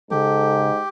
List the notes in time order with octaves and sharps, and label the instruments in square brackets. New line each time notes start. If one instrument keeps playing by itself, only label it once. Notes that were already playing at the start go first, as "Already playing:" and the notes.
[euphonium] G#2 [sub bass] C#3 [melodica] G4 [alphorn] A4